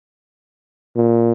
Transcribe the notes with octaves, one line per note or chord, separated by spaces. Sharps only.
A#2